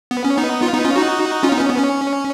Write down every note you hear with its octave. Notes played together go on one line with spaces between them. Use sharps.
B3
C#4
B3 D#4
F4
B3 D#4
C#4 F4
D#4 F#4
C#4 F4
B3 D#4
C#4
B3
C#4